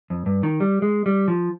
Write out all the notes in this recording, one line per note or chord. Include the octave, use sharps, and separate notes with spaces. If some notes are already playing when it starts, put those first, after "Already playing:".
F2
G2
D#3
G3
G#3
G3
F3